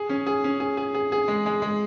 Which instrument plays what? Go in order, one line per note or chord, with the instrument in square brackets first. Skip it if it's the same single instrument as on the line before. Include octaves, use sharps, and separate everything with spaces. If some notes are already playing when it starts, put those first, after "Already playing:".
Already playing: [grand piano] G#4
C#4
G#4
C#4
G#4
G#4
G#4
G#4
G#3
G#3
G#3